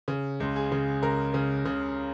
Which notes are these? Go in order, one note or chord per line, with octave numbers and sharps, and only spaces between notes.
C#3
C#2
G#4
C#3
C#2 A#4
C#3
C#3